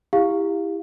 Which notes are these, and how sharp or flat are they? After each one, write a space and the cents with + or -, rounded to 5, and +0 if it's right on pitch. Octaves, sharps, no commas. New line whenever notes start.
E4 +0 G4 +25 F5 +5